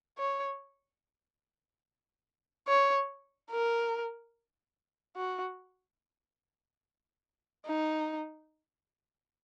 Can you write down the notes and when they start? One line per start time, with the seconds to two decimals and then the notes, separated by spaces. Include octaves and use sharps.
0.18 C#5
2.68 C#5
3.51 A#4
5.16 F#4
7.66 D#4